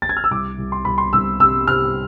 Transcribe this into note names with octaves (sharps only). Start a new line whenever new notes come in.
A6
G#6
F6
E6
C2 D6
C2
C6
C2 B5
C6
C2 E6
C3 E6
C3 F6